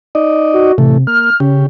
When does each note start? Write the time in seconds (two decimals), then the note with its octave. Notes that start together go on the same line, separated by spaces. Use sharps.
0.15 D#4 D5 D#5
0.54 F#4
0.78 A2 C3 E3 A3
1.07 A#3 F6
1.40 C#3 C#4 G4